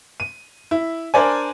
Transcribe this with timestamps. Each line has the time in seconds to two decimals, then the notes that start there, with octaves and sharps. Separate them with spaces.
0.20 D#7
0.71 E4
1.14 D4 A#4 C5 D5 G#5